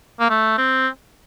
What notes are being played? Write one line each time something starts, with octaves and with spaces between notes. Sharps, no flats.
A#3
A3
C4